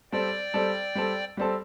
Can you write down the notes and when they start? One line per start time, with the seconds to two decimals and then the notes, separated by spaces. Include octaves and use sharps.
0.12 G3 C4 A4 D5 G5
0.54 G3 C4 A4
0.95 G3 C4 A4
1.37 G3 C4 A4